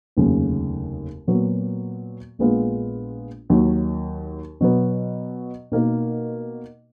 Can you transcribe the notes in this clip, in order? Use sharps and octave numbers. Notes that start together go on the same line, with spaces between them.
F1 D#2 C#3 F#3
A#2 F#3 B3 F#4
A#1 A#2 G#3 B3 F4
D#2 D#3 F#3
B2 F#3 B3
B2 A#3 D#4 A#4